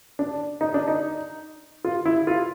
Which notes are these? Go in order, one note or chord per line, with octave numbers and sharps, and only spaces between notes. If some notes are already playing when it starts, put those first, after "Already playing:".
D4
D#4
D4
D#4
F4
E4
F4